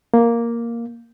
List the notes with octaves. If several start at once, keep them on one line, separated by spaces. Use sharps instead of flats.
A#3